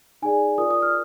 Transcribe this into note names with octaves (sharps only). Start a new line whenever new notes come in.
D#4 G#4 D5 G#5
F4 A#4 D5 D#6
D#6
F6